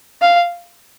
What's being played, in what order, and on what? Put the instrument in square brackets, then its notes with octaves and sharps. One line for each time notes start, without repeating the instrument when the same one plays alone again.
[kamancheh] F5